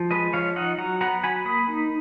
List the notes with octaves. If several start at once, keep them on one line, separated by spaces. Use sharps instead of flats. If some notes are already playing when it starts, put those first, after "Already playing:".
Already playing: F3
G#3 B4 D#5
F3 C#5 F5
D#4 D#5 F#5
F#3 F#5 A#5
B3 F#5 A#5
F#3 G#5 B5
A#3 B5 D#6
D#4